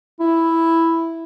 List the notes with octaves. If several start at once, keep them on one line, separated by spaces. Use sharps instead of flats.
E4